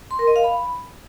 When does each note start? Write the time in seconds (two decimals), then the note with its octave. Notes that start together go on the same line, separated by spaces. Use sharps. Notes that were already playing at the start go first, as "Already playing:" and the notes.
0.11 C6
0.19 A#4
0.27 D#5
0.36 F5
0.44 B5